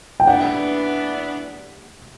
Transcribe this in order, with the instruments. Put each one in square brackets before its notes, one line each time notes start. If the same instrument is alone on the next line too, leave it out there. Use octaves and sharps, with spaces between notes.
[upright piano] G5
[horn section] E3 B3 D4 [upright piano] F#5